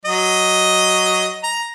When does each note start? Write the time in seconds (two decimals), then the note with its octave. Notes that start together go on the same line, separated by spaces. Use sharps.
0.05 F#3 D#5
1.43 A#5